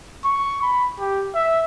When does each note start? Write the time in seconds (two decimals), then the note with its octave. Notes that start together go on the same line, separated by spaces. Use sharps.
0.25 C#6
0.62 B5
0.99 G4
1.35 E5